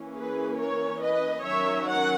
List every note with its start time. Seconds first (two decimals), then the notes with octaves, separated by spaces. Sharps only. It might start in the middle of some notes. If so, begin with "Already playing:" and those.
Already playing: E3 A#3 C#4
0.16 G#4 B4
0.59 A#4 C#5
1.02 B4 D#5
1.44 D#3 F#3 C#4 C#5 E5
1.87 F#5